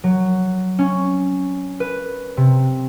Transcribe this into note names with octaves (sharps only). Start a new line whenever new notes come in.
F#3
C#4
B4
C3